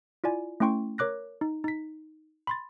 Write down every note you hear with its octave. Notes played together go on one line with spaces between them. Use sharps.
E4 F4 D5 G#5
A3 C#4 E4 G5 C6 C#6
A#4 C#5 D6 F#6 A#6
D#4
D#4 B6
B5 C6 A6